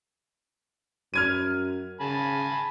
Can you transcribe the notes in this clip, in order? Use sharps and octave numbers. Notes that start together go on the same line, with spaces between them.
F#2 F6 G#6 D#7
C#3 G#5 A5 B5